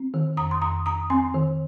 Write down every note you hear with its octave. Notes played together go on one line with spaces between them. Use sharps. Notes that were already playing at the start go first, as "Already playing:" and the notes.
Already playing: C4
D#3
F2 A#5 D#6
C6
F2 A#5 D#6
F2 A#5 D#6
C4 G#5 C6
D#3